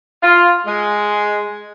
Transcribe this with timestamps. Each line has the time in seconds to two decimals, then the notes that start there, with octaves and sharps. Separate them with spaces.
0.23 F4
0.66 G#3